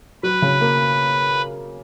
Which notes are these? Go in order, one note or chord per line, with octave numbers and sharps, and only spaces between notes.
F#3 B4
C#3
A#3